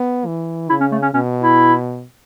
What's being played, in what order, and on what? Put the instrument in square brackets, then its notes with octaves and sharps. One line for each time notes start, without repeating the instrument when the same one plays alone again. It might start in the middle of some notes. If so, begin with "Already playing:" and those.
Already playing: [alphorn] B3
E3
[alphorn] C#3 [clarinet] E4
[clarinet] C#4
A3
C#4
[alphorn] B2 [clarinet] C#4
[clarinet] E4